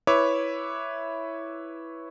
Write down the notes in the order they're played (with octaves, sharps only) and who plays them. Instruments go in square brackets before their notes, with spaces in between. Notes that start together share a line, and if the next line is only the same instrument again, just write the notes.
[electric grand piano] E4 B4 C#5 E5 D6